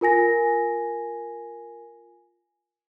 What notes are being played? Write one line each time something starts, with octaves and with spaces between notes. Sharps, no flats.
F4 A#4 G#5 A#6